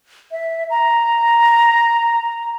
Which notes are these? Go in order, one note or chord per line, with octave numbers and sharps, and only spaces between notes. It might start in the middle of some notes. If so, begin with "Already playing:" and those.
E5
A#5